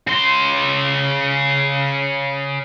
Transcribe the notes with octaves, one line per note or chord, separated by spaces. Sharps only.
C#3 C6